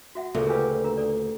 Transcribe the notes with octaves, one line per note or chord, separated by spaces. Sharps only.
F#4 E5 F#5
D2 A#2 C#3 F#4 E5
A#2 G4 B4 G#5 E6
D4 A#4 A#5
A4 D5